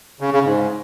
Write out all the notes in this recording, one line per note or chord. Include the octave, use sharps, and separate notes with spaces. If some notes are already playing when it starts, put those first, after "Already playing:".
C#3
C#3
G#2